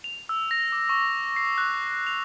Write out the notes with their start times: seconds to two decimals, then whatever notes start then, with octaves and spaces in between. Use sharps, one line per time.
0.04 F7
0.29 E6
0.51 A#6
0.72 D6
0.89 C#6
1.36 C7
1.58 F#6
2.07 F7